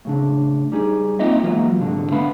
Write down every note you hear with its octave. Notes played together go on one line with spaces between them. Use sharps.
A2 C#3 D4
G3 D#4 G#4
A#3 C4 D#4 F4 D#5 E5
E3 F#3 G#3 A#3 B3 F4
C2 G#2 D3
A3 B3 D4 F5 B5